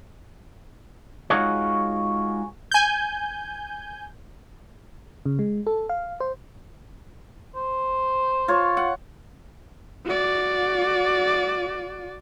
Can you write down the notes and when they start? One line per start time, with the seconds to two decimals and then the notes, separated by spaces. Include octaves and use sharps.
1.30 G#3 D#4 F4 F#4 G#4 C#5
2.71 G#5 G6
5.25 C#3
5.39 G#3
5.67 A4
5.89 F5
6.20 C5
7.55 C5
8.48 F4 C#5
8.77 F#5
10.05 F#4 D5